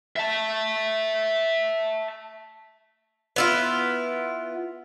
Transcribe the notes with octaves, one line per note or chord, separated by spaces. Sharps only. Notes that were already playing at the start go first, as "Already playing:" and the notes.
E5 A5
B3 E4 F4